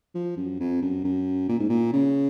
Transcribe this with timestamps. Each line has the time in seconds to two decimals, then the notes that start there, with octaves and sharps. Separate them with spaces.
0.15 F3
0.37 F#2
0.60 F2
0.82 F#2
1.04 F#2
1.49 A#2
1.59 G#2
1.69 A#2
1.93 C#3